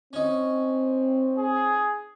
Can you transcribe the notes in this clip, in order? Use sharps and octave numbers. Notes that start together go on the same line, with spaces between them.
C4 C#4 D#4
G#4